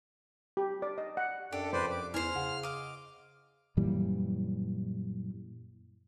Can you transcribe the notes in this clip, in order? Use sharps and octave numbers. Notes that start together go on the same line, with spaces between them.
G4
D5
D#5
F#5
F#2 D4 G4 A4
F2 B4 C5 D5
D6
E2 C5 G#5 F6
C#3 F#5
D#5 F5 D6
F#2 A#2 E3 G3